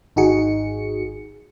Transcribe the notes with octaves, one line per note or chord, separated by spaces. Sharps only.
G#1 D#4 F#4 G#4 C#7